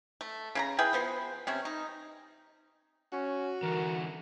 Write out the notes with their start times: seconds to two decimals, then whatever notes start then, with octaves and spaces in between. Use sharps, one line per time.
0.21 A3
0.55 C#3 E4 A#5
0.78 E4 G#4 B4 G5
0.93 F3 B3 C5
1.47 C3 C4 C#4
1.65 D#4
3.13 C#4 F#4
3.63 D3 E3 A#4